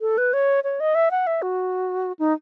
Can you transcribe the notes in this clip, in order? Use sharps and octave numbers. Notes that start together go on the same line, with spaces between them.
A4
B4
C#5
C#5
D#5
E5
F#5
E5
F#4
D#4